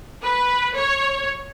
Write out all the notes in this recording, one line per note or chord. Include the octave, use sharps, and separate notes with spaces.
B4
C#5